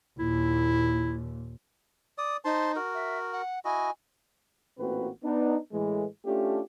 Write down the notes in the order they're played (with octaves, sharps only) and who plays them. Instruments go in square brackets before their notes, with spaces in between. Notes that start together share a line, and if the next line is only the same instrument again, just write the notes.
[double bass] D#2 A#2 [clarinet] E4
[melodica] D5 D#6
[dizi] D#4 [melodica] C5 A5 C6
[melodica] F#4 A#4
[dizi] E5
F#5
[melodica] E4 F#4 D#5 [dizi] G#5
[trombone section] A1 A#2 A#3 C4 F#4 B4
B3 D4 D#4
A2 E3 G#3
A3 C#4 D4 F4 G4